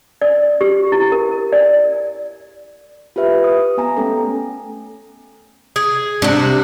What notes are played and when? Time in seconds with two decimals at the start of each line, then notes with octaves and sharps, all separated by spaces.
0.22 D5
0.61 G4
0.92 E4
1.12 A#4
1.53 D5
3.16 F4 G4 B4 E5
3.44 D#6
3.77 B3 G#5 A#5
3.97 A3 C#4 A4
5.76 G#4
6.22 C3 D4 F#4